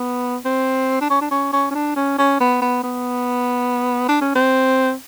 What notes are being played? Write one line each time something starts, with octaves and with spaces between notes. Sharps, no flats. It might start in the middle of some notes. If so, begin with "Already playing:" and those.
Already playing: B3
C4
D4
C#4
D4
C#4
C#4
C#4
D4
C#4
C#4
B3
B3
B3
D4
C#4
C4